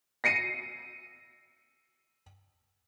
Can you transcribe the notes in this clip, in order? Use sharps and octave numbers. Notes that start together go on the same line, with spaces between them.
A#6 C7 C#7 D#7